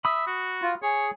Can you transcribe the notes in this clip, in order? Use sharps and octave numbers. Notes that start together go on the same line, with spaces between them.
E5 B5 D#6
F#4
F4
G#4 C#5